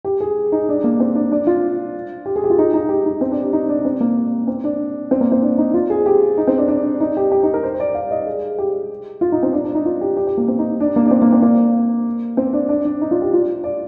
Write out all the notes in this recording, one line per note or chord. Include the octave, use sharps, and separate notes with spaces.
G4
G#4
D#4
D4
A#3
C4
D4
D4
F4
G4
G#4
G4
F4
D#4
D#4
G4
D#4
C4
D4
G4
D#4
D4
C4
A#3
C4
D4
C4
A#3
C4
D4
D#4
F4
G#4
G4
D#4
C4
D4
D4
D#4
G4
G4
D#4
A#4
C5
C5
D5
F5
D#5
G#4
G4
F4
D#4
C4
D4
D4
D#4
F4
G4
G4
G4
A#3
C4
D#4
D4
A#3
D4
C4
A#3
C4
A#3
C4
D4
D4
D4
D#4
F4
G4
F4
D5